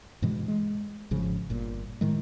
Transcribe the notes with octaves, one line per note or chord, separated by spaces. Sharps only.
G2 B2 E3 G#3
G#3
G#1 C#3 F3
G1 A#2
A2 D#3 G#3